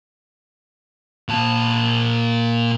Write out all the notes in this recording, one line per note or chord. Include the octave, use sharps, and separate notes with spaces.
A#2 A5